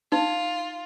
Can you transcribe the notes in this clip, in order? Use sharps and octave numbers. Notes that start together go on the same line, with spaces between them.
D#4 F4